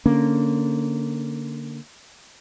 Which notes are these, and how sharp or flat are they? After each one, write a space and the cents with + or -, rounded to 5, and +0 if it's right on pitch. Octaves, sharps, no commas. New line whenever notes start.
D3 +0 A#3 -10 C#4 +0